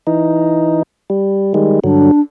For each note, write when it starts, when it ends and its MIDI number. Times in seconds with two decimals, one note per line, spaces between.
0.07 0.83 52
0.07 0.83 63
1.10 1.54 55
1.54 1.80 51
1.54 1.80 55
1.54 1.80 56
1.84 2.11 43
1.84 2.11 50
1.84 2.11 54
1.84 2.20 62